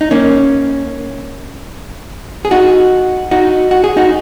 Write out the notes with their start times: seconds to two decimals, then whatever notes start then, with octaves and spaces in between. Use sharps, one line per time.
0.01 D#4
0.11 A#3 C#4
2.45 G#4
2.51 D#4 F#4
3.31 D#4 F#4
3.71 F#4
3.84 G#4
3.97 D#4 F#4